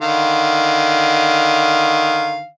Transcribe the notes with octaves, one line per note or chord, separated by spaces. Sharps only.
D3 D#3 F5